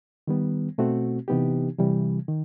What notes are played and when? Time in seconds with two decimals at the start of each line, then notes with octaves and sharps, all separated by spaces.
0.27 D#3 G3 B3
0.78 B2 A3 C4 F#4
1.28 C3 E3 B3 D#4 G4
1.78 C3 E3 G3
2.28 D#3